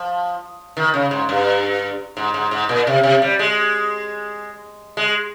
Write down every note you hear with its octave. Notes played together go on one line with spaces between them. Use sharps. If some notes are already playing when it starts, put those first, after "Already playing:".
Already playing: F3
D#3
C#3
G#2
G2
G#2
G#2
G#2
A#2
C3
C3
G3
G#3
G#3